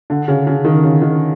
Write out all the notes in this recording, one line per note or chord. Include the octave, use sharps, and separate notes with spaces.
D3
C#3
C#3
D#3
C#3
D#3